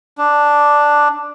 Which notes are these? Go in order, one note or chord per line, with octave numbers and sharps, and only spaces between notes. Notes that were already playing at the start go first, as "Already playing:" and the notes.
D4